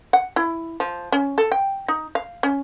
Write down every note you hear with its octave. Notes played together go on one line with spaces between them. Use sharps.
F#5
E4
F3
C#4
A4
G5
D#4
F5
C#4